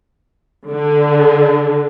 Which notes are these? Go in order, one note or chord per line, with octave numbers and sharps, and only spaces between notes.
D3